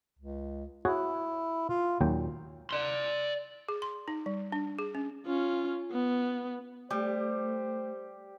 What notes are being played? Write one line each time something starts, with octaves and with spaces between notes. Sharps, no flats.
C#2
E4 F#4 G#4 C#5
F4
D#2 A#2 F#3 G5
D5 C6
G#4
C6
D#4
G3
D4
G#4
C#4
C#4 F4
B3
G3 A3 G4 C5